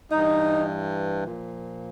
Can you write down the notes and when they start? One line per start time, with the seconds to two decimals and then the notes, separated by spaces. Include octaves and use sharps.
0.11 G2 E3 D#4
1.25 A#2 F3